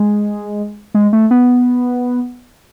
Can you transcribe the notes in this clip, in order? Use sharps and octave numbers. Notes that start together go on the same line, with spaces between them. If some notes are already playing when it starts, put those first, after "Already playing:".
Already playing: G#3
G#3
A3
B3